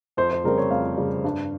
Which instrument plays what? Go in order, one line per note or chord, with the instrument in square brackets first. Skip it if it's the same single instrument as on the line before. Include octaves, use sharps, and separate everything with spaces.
[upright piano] F2 C5
C5
C#3 G3 C4 A#4
C#5
F2 F5
C#3 G3 C4
G2